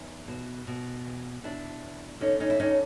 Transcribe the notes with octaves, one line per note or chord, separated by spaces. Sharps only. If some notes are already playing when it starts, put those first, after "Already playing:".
Already playing: E2 D#4
B2
B2
E2
B2 D4 E4
E2
D3 C#4 D#4
C#4 D#4
E4
D2 C#4 D#4